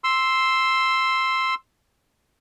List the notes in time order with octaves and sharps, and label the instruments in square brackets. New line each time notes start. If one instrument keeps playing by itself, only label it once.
[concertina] C6 E6